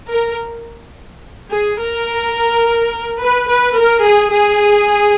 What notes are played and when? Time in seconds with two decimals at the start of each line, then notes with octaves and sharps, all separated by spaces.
0.09 A#4
1.51 G#4
1.79 A#4
3.21 B4
3.49 B4
3.77 A#4
4.06 G#4
4.33 G#4